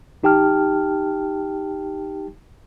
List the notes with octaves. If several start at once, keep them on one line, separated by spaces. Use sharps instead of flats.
A1 D#4 G4 G5 A5 F6